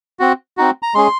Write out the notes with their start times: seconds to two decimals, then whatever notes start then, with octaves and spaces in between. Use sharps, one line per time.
0.19 C4 F#4
0.57 C4 D#4 F#4
0.83 A#5
0.94 G#3 C#4 G#4 C6